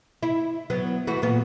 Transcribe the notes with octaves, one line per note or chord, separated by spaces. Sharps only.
E4
F#3 B3
E3 A3 F#4
A#2 B3